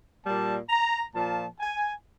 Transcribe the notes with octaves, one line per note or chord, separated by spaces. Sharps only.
A#2 G3 A#3 A5
A#5
A#2 F3 A#3 A5
G#5